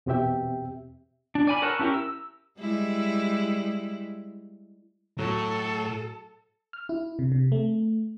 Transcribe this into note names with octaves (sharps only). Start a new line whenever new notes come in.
E2 B2 C4 G4 E5 G5
D4
D5 G#5 B5
A4 A#4 C#5 F#5 A5
C#4 E4 G4 A#4
E6
G3 G#3 E4
A2 F#3 A4
F6
E4
C3
C3
A3